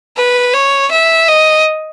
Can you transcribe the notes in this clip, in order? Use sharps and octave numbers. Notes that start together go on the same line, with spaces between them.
B4
C#5
E5
D#5